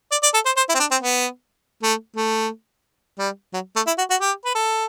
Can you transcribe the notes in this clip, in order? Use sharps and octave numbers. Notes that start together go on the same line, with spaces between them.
D5
D5
A4
C5
C5
E4
C4
D4
C4
B3
A3
A3
G3
F#3
A3
E4
F#4
F#4
G4
B4
A4